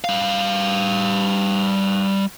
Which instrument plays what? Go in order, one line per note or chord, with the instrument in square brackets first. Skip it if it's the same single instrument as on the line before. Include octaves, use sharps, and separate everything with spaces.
[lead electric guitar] G3 F5